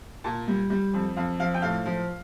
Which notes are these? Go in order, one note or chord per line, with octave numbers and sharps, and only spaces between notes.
A#2 A5
G3
G3
F2
F2 F5
F3 F5
G5
A2 F5
F3